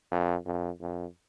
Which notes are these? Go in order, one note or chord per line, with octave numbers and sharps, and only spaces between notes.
F2
F2
F2